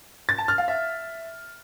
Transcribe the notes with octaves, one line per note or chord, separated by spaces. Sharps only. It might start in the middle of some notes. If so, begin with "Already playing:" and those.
A6
A5
F6
F5
E5